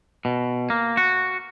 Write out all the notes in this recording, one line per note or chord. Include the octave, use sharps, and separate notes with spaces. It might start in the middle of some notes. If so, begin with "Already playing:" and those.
B2
A#3
F#4